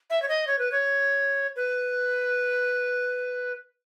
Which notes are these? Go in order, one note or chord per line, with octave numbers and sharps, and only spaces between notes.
E5
C#5
D#5
C#5
B4
C#5
B4